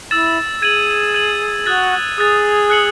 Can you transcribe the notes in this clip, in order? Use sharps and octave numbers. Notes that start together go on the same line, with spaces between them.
E4 E6 A6 E7
G#4 G#6 D#7 F#7
G#6 D#7 F#7
F#4 D#6 F#6 A6
G#4 D#6 F#6 A6
F#6 C#7 F#7